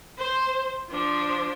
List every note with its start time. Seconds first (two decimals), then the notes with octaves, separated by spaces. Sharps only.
0.18 C5
0.90 F3 D4